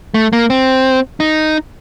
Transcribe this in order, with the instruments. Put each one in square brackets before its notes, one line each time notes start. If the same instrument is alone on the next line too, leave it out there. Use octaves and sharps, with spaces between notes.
[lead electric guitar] A3
A#3
C4
D#4